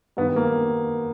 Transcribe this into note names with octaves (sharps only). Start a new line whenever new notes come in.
G2 D#3 B3
A#3